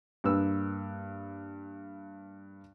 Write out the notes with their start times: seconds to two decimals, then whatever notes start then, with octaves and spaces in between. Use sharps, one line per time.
0.24 G2 A#3 B4 E6